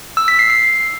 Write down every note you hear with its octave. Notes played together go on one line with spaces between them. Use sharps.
E6
B6
C7
C7